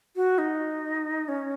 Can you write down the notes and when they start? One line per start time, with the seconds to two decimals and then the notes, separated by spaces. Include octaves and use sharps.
0.16 F#4
0.38 D#4
1.28 C#4